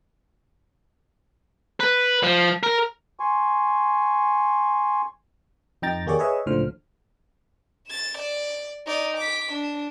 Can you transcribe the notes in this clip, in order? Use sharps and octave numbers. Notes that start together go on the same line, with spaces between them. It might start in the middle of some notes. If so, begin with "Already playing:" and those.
B4
F3
A#4
G#5 C6 C#6
F2 D#4 G5 A#5 A6
D#2 A#3 G4 G#4 C#5 D5
G#4 B4 C#5 D#5 E5
C#2 A2 D3 F3 C5 F6
A6 E7
D5
D#4 D5
D6 B6
D4